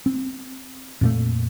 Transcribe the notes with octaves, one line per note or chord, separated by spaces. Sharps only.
C4
F2 A#2 A3